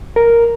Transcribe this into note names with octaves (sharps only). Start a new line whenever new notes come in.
A#4